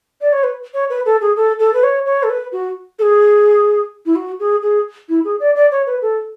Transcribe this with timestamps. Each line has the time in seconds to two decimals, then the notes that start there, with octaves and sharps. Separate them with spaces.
0.21 D5
0.32 C#5
0.43 B4
0.74 C#5
0.90 B4
1.06 A4
1.21 G#4
1.36 A4
1.59 A4
1.73 B4
1.83 C#5
2.06 C#5
2.23 A4
2.30 B4
2.52 F#4
2.99 A4
3.02 G#4
4.06 E4
4.16 F#4
4.40 G#4
4.62 G#4
5.09 E4
5.25 G#4
5.40 D5
5.55 D5
5.71 C#5
5.87 B4
6.02 A4